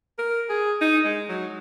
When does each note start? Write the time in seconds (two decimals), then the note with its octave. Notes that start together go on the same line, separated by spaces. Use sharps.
0.19 A#4
0.50 G#4
0.81 D#4
1.05 G#3
1.29 F#3